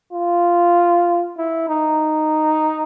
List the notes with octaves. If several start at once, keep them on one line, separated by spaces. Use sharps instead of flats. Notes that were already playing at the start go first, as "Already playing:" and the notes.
F4
E4
D#4